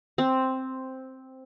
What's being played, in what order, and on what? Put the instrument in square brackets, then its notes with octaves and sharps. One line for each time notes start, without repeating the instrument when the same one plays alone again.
[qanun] C4